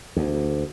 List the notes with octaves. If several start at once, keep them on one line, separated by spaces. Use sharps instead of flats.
D2